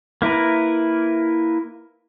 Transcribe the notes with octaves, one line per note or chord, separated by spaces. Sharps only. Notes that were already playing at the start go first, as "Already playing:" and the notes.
A#3 E4 A#4 B4